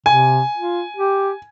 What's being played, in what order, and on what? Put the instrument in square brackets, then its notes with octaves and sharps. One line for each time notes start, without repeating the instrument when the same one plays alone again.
[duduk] C3 [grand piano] G#5
[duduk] F4
G4